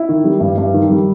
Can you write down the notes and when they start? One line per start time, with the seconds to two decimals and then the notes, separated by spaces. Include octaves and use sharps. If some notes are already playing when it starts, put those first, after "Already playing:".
Already playing: E4
0.09 D#3
0.24 G3
0.40 G2
0.58 G2
0.74 D#3
0.90 G3